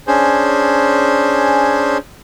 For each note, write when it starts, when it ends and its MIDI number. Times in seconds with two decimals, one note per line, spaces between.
0.07 1.97 61
0.07 1.97 62
0.07 1.97 68
0.07 1.97 72